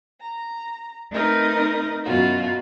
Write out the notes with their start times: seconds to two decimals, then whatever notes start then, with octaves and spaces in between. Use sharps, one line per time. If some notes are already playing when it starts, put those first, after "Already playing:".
0.20 A#5
1.10 A3 C4 D#4 A#4 B4 D#5
2.03 F#2 B2 F4 F#4